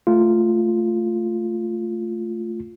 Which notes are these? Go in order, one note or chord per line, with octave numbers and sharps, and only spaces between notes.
A3 F4